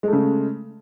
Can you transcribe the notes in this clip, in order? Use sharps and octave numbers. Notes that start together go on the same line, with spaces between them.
C#3 G#3 A3